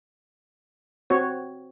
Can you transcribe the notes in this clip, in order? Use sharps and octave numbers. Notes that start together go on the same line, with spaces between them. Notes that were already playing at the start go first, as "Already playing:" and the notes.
C4 F#4 C#5